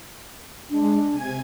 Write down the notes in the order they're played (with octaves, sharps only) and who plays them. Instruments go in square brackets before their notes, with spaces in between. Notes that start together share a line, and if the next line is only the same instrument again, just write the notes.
[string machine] G#3 [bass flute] D4
[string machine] C3 G#5 G#6